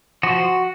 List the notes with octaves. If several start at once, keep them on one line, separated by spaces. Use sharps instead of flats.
F3 F#4